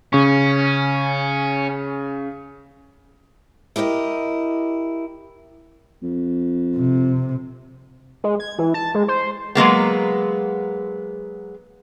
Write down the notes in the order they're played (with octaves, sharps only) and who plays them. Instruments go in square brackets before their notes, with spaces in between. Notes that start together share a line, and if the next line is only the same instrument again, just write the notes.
[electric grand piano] C#3 C#6 [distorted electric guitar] C#4
[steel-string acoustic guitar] E4 G4 A#4 B4 D#5
[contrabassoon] F2
[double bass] C3
[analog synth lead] G#3
G#6
E3
A5
G#3
C5
[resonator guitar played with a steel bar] F#3 G#3 A#3 B3